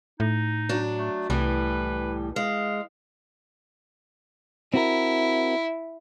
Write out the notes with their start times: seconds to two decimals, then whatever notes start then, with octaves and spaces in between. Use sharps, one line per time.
0.20 A2 D#4
0.69 F#3 D4
0.98 A3
1.30 C2 A2 E3 G3 B4
2.36 G#3 F5
4.74 C4 E4 F#4 A#4